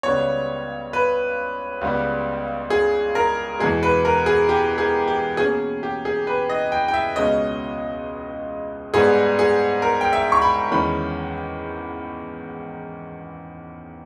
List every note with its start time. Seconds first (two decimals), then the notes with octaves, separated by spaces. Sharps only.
0.03 C#2 C#3 G3 B3 C#5
0.93 B4
1.81 C#2 C#3 G3 B3
2.70 G#4
3.15 A#4
3.60 E2 B2 G#3 G#4
3.83 B4
4.05 A#4
4.26 G#4
4.49 G4
4.78 G#4
5.08 G4
5.37 B2 A#3 C#4 G#4
5.83 G4
6.05 G#4
6.27 B4
6.49 D#5
6.72 G5
6.88 G5
6.94 E5
7.16 C#2 B2 G#3 C#4 D#5
8.94 G#2 G3 B3 G#4
9.39 G#4
9.82 A#4
10.01 G5
10.13 E5
10.32 C#6
10.42 B5
10.71 E2 D#3 G#3 C#4 B5